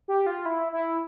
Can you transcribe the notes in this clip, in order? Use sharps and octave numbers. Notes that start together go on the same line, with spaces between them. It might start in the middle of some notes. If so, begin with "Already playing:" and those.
G4
F4
E4
E4